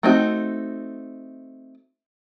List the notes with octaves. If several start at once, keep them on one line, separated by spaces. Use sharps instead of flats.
A3 C4 D#4 F#4